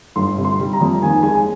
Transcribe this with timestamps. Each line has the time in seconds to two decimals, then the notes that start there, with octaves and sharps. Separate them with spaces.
0.16 G1 C6
0.38 C3
0.45 C6
0.60 G3
0.73 A#5
0.81 F2
1.02 D#2 G#5
1.23 G#3 G#5